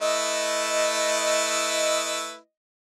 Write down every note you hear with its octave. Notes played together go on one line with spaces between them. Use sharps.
A3 E4 B4 D#5